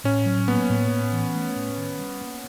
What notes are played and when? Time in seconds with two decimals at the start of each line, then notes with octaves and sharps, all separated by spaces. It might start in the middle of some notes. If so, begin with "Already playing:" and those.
0.04 A2 C#4
0.26 F#3
0.48 A#3 B3
0.70 A2
0.91 A2
1.13 E3
1.35 A3
1.56 A2
1.78 D#3
1.99 G3
2.21 A#3